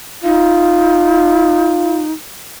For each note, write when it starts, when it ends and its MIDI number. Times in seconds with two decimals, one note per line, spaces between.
0.24 2.12 63
0.24 2.06 65